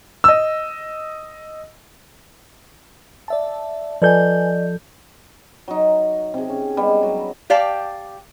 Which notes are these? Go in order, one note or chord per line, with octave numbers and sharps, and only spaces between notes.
D#5 E6
D5 E5 A5
F3 A4 B4 D5 D#5 G#5 G6
F#3 D#4
C3 G#4
C#4
G3 G#3 B3
F#3
G4 D5 F5 G5 A5